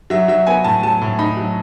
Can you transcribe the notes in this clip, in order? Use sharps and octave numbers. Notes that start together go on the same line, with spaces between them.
F#3 E5
F#3 E5
B3 G#5
A2 A5
F#3 A5
A2
D#4 B5
F#3